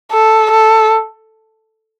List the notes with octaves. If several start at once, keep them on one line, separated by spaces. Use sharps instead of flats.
A4
A4